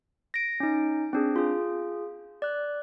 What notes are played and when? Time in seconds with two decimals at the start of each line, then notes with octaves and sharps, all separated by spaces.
0.34 A#6 D7
0.60 C#4 D#4
1.13 C4 D4 G#4
1.36 F4 G#4
2.42 D5 F#6